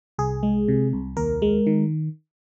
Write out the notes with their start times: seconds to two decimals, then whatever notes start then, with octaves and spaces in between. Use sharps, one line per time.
0.18 C2 G#4
0.43 G#3
0.68 C3
0.93 C2
1.17 D#2 A#4
1.42 G#3
1.67 D#3